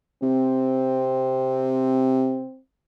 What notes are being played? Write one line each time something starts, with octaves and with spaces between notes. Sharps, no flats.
C3 C4